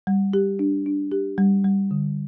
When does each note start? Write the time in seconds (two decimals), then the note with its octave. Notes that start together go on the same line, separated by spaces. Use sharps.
0.07 G3
0.33 G4
0.59 D4
0.86 D4
1.12 G4
1.38 G3
1.64 G3
1.91 D3